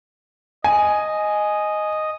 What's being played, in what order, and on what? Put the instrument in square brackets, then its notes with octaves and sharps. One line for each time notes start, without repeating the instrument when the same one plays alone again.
[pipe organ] D#5 [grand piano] G#5